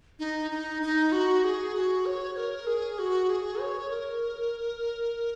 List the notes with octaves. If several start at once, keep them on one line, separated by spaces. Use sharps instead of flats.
D#4
D#4
D#4
F#4
G#4
F#4
C#5
A#4
G#4
F#4
G#4
C#5
A#4